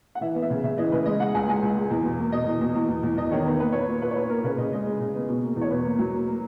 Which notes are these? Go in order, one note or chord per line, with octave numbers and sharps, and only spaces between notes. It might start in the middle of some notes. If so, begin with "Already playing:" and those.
F#5
E3 E5
B3
E5
C#3
C#3 E5
E3 D#5
C#3 B4
G#3 D#5
G#3 F#5
C#2 G#5
G#3 G#5
C#2
G#3
E2
B2
A#3
B2 D#5
E2
B2
E2
E2
E2
E2 D#5
D#3 C#5
B3 B4
A#3 B4
A#2 C#5
B4
A#2
A#2 B4
C#5
A#2 B4
A#3 A#4
C#3 B4
C#3 D#5
G#3 D#5
G#3
C#3
B3
B2
A#3
E2
C#5
B2 B4
A#3
F#3
A#3
A#3